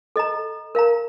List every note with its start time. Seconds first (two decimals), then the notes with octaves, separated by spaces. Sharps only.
0.16 A4 D#5 A#5
0.75 A#4 F5 A#5